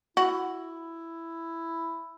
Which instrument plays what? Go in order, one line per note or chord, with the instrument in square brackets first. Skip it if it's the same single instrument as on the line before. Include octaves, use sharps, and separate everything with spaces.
[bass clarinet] E4 [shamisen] F#4